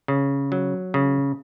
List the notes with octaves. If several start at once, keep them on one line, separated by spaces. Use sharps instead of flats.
C#3
F#3
C#3